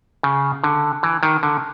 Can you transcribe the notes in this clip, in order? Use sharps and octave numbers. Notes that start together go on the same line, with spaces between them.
C#3
D3
E3
D#3
D3